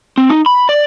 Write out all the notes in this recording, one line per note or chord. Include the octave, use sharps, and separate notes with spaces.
C4
D#4
B5
D5